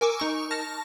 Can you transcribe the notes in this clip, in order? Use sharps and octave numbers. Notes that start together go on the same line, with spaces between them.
A#4 G#5 C#6 D6 E6
D#4 C#6
A5 F6 A#6